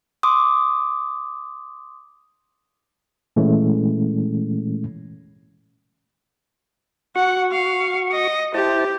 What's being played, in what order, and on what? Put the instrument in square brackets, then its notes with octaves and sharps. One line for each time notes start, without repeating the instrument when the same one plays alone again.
[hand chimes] C6 D6 D#6
[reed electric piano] A#2 E3 G#3 A3 C#4
[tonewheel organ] F#4 C#6 [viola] F#5
[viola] F5
D#5
[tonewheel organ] E4 C5 A5 [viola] G4